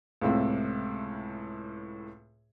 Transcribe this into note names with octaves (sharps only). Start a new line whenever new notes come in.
C#2 A2 C3